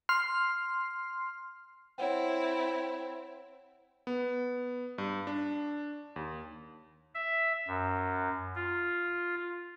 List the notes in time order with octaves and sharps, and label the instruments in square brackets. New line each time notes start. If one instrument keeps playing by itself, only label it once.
[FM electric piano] C6 F6 C7
[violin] C4 E4 [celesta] C#5 F#5 G5
[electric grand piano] B3
G2
D4
D#2
[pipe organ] E5
F#2
F4